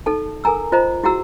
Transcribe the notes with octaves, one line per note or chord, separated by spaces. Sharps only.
D#4 A4 A5
A4 A#4 G#5 A#5 E6
F4 C5 D#5 A#5
E4 F#4 G#4 F#5 A#5 E6